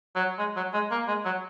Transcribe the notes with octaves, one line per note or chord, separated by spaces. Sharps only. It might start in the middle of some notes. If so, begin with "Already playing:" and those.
F#3
G#3
F#3
G#3
A#3
G#3
F#3